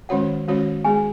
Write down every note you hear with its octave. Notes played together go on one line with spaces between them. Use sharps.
D#3 G#3 C#4 F#4 C#5 F#5
D#3 G#3 C#4 F#4 C#5
G#3 B3 G#4 G#5